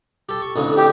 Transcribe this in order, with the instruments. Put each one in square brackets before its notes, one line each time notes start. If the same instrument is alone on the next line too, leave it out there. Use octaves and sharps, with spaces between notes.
[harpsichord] G4 A4
C#6
A1 F2 D3
[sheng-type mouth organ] G4